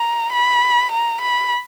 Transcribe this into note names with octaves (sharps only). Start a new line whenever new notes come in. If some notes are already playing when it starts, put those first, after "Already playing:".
Already playing: A#5
B5
A#5
B5